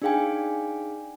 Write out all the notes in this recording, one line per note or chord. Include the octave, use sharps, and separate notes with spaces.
D4 D#4 G#4 F5 G5 G#5